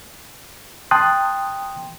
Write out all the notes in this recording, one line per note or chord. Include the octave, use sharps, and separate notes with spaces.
G5 A5 C6 D#6 F#6